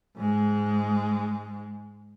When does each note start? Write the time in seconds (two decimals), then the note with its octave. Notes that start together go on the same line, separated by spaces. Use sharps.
0.18 G#2 G#3